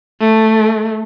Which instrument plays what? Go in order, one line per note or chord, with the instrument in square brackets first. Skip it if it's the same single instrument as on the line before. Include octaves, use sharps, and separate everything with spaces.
[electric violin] A3